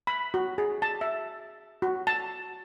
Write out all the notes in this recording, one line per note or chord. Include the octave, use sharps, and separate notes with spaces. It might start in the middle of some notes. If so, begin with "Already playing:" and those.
B5
F#4
G#4
A5
E5
F#4
A5